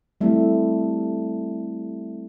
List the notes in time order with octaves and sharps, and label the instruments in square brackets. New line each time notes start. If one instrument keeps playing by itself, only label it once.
[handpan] G3 A3 C4 E4